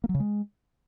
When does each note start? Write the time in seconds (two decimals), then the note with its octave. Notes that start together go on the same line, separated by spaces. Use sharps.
0.04 A#3
0.09 F#3
0.15 C#3
0.20 G#3